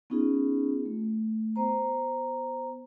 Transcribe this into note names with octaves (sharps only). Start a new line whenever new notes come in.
B3 C#4 D#4 F4 G#4
A3
B3 C5 A#5